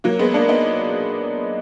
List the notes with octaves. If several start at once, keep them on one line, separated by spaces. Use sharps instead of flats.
F#3 A#3
G#3 B3
A#3 D4
B3 D#4